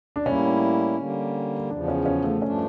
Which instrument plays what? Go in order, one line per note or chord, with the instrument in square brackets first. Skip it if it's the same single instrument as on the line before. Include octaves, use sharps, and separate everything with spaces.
[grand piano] D4
[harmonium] A2 G3 A#3 E4 [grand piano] C#4
[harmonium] D3 G3 A#3
[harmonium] E2 C#3 F3 [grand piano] D4
[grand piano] C#4
C#4
A3
[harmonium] G2 F3 A3 D4 [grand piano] C#4